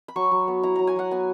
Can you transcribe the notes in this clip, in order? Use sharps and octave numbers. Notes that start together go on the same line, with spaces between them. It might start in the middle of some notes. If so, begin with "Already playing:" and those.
B5
F#3 C#6
F#3
B3
E4 A#5
F#3 A#5
G#5
F#3 F#5
B3 G#5